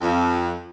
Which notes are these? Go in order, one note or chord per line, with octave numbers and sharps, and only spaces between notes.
F2